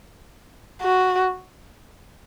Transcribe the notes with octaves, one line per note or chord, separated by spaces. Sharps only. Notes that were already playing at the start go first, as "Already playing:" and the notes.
F#4